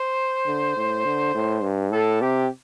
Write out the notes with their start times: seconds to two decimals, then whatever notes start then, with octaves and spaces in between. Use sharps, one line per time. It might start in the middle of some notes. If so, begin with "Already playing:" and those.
Already playing: C5
0.47 D3
0.77 A2
1.05 D3
1.35 A2
1.63 G2
1.92 A2 A4
2.21 C3 G4